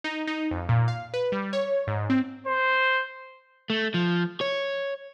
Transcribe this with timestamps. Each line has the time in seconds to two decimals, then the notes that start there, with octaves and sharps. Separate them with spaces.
0.04 D#4
0.27 D#4
0.51 F2
0.69 A#2
0.88 F5
1.14 B4
1.32 G3
1.53 C#5
1.87 G#2
2.10 C4
2.47 C5
3.70 A3
3.94 F3
4.41 C#5